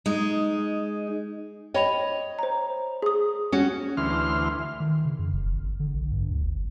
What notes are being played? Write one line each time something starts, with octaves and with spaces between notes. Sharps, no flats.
G#3 D#4
C#5 D#5 G5 B5 F7
C5 A#5
G#4 D#6
C#4 F#4
D2 E3 C6 F6
D#3
C#3
F#2
F1
G1
D3
A#1
G2
D2
G1